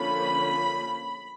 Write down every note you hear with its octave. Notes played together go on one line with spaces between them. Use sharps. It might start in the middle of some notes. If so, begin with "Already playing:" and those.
Already playing: D3 F3 A#3 C#4 B5